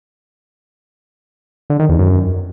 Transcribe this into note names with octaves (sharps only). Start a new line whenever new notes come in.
D3
D#3
E2
F#2